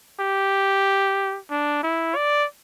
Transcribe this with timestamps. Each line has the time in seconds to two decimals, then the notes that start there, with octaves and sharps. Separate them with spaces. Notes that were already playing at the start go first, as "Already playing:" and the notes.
0.20 G4
1.51 D4
1.83 E4
2.16 D5